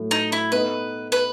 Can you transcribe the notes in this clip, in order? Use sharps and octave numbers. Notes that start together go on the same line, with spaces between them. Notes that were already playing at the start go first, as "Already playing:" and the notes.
Already playing: A2 F#3 A3
D#4
E4
B3 D#4 A4 B4 D#5
B4